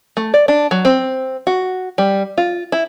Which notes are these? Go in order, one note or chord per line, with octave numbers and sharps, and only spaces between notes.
A3
D5
D4
F#3
C4
F#4
G3
F4
E4